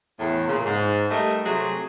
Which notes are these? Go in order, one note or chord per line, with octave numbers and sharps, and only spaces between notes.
E2 A2
A#2 C#3
G#2
G3 A3 A#4 D#5
C3 F#3 A3 G#4